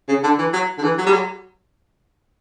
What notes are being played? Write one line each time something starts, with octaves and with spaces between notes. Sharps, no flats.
C#3
D3
E3
F#3
D3
E3
F#3
G3
F#3